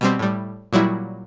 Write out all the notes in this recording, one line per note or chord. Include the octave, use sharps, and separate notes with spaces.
B2 G3 C4
A2 G3
A#2 F#3 G3 E4